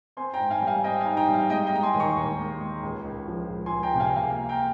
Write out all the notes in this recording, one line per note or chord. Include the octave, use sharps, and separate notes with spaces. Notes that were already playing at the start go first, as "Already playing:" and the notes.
C4 G#5 C6
G5 A#5
G#2
F5 G#5
G3
F5 G#5
C4 D#5 G5
F5 G#5
D#4
G5 A#5
G3
F5
G#3 D#5 G5
D#5 G5
G#3 A#5
G#5 C6
D#2
A#5 C#6
D#2
G#3
G#3
C#2
C#2
F3
C#2
G#5 C6
C#2
G5 A#5
C3
F5 G#5
A#3 F5 G#5
A#3
G5 A#5